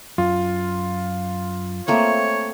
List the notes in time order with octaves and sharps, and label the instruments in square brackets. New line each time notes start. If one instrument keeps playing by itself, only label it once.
[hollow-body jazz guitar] F#2 [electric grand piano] F4
[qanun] A3 A#3 C4 [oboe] C#5